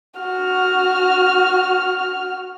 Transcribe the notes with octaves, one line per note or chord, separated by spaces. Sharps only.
F#4 F6